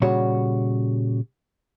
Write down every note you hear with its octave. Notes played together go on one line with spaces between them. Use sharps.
A#2 C#3 G3 F#4 C#5